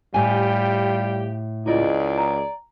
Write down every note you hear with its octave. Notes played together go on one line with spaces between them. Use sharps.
A2 G3 F4 G4 G#5
C#2 G#3 E4 F4 D5 D#5
A#5